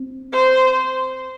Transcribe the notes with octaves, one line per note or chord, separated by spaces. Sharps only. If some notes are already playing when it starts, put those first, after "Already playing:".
Already playing: C4
C5